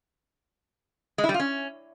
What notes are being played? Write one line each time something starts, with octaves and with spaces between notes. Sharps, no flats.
G#3
E4
G3
F4
C#4